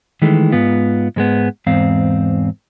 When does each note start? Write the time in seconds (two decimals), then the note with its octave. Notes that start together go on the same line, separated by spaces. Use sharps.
0.22 D#3 E3 G#3 A3
0.52 G#2 B3 F4
1.16 G#2 G#3 B3
1.67 E2 G#2 C4 F5